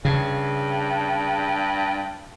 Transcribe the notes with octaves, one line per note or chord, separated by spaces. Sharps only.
G2 C#3